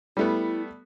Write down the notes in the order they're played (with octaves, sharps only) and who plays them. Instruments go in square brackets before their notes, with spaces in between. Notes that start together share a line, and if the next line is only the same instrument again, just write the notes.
[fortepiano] G3 A3 B3 [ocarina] E4